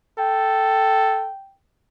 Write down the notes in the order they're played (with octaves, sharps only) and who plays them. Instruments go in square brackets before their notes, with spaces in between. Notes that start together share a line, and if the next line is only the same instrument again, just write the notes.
[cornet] A4 [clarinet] G5